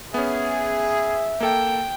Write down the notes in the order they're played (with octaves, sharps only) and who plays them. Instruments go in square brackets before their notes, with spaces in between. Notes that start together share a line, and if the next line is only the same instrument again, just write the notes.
[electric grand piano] B3 C#4 [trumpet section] G#4 [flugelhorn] E5
[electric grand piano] A#3 A4 [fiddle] G5